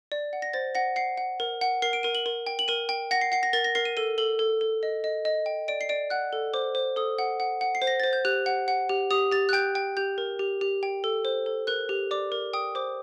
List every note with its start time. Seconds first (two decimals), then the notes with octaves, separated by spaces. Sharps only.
0.12 D5
0.33 F#5
0.42 A#6
0.53 C5 A6
0.75 F#5 A#6
0.96 F#5 C7
1.17 F#5
1.40 A#4
1.61 F#5
1.82 A#4 C7
1.93 D7
2.03 A#4 D#7
2.15 F#7
2.26 A#4
2.46 G5
2.59 F#7
2.68 A#4 D#7
2.89 G5
3.11 F#5 A#6
3.21 C7
3.32 F#5 C7
3.43 A#6
3.53 A#4 A6
3.64 A#6
3.75 A#4 C7
3.85 D#7
3.97 A4 D#7
4.18 A4 F#7
4.39 A4
4.61 A4
4.83 D#5
5.04 D#5
5.25 D#5
5.46 G5
5.68 D5 D7
5.81 C7
5.89 D5 D7
6.10 F#5 F#6
6.33 A4
6.54 C5 D6
6.75 C5
6.96 A4 D#6
7.19 F#5
7.40 F#5
7.61 F#5
7.75 C7
7.82 C5
7.87 A#6
8.00 C5 A6
8.13 G6
8.25 G4 F#6
8.46 F#5
8.68 F#5
8.89 G4
9.11 G4 D#6
9.32 G4 A6
9.49 F#6
9.53 G5 G6
9.75 G5
9.97 G4 G6
10.18 A#4
10.39 G4
10.61 G4
10.83 G5
11.04 A4
11.25 C5
11.46 A4
11.67 A#4 F#6
11.89 G4
12.11 D5 D6
12.32 A#4
12.53 G5 D#6
12.75 C5 D6